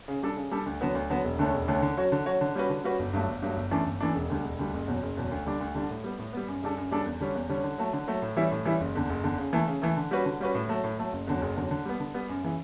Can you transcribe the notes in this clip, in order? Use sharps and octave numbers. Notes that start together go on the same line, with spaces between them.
C#3
G3 D4 A4
C#3
G3 D4 A4
D2
D3 F#3 B3
D2
D3 F#3 B3
E1
D2 D3 A3 C#4
E1
D2 D3 A3 C#4
D3
F#3 C#4 F#4 C#5
D3
F#3 C#4 F#4 C#5
D3
G3 C#4 F#4 B4
D3
G3 C#4 F#4 B4
G1
G2 F#3 A3
G1
G2 F#3 A3
G1
F#2 E3 A3 D4
G1
F#2 E3 A3 D4
E1
D2 D3 G3
E1
D2 D3 G3
F#1
E2 B2 F#3
F#1
E2 B2 F#3
D2
D3 G3 D4
D2
D3 G3 D4
A2
G3 B3
A2
G3 B3
F#2
C#3 G3 D4 A4
F#2
C#3 G3 D4 A4
E2
D3 G3 C#4
E2
D3 G3 C#4
D3
F#3 A3
D3
F#3 A3
A2
E3 G3 C#4 E4
A2
E3 G3 C#4 E4
F#1
E2 D3
F#1
E2 D3
C#3
E3 A3
C#3
E3 A3
D3
G3 C#4 F#4 B4
D3
G3 C#4 F#4 B4
A2
F#3 A3
A2
F#3 A3
F#1
E2 D3 F#3
F#1
E2 D3 F#3
D3
G3 B3
D3
G3 B3
F#2
C#3 E3